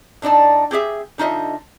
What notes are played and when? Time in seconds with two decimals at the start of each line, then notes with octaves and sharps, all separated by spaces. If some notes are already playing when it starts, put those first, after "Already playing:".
0.22 A2 D4 D#4 D5 A5
0.71 C4 G4 G#4 E5
1.18 D3 D#4 F4 D#5 E5